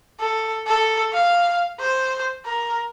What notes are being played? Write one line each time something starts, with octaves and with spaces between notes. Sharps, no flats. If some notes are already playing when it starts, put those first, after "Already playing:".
A4
A4
F5
C5
A#4